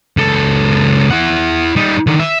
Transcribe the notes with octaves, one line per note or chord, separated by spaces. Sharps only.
C#2 A4
E4 F#5
G3 D#4
D3 D#3
E5